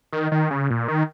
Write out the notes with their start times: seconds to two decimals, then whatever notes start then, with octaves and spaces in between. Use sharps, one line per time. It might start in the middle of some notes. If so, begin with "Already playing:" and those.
0.13 D#3
0.32 D#3
0.51 C#3
0.70 A#2
0.88 D#3